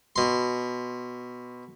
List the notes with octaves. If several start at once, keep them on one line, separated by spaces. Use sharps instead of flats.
B2 C6